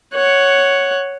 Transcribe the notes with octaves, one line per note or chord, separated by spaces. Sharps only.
C#5 F#5